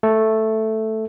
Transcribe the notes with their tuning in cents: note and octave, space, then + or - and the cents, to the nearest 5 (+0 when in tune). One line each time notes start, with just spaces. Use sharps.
A3 +0 A4 +0